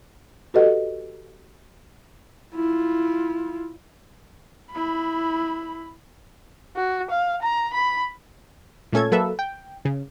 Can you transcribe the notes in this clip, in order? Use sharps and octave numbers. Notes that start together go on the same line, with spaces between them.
F#4 G4 A4 B4 D#5 F#5
E4 F4
E4 B5
F#4
F5
A#5
B5
A#2 A3 C#4 A4 G#6
F#3 A#3 A4 B4 E5
G5
C#3